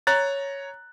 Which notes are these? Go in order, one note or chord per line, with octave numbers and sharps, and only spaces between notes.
C#5 A#5 F#6 A6